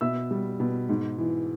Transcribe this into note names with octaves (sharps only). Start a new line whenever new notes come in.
B2 E5 E6
G3
B2
G#2
E3